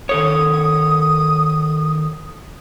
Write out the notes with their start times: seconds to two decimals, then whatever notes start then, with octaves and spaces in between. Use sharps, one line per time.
0.09 D#3 A4 C#5 D#6